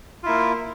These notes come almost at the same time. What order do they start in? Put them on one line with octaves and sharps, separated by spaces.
F4 E4 A#3